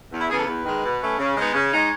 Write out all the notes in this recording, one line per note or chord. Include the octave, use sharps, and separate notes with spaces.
E2
E4
C#3 E3 B3 G#4
A4
E2 B4
D#3 G#3
B2
A3 C#4
C#3
G#3 B3 D#4
C#3 C#5
G#3 D#4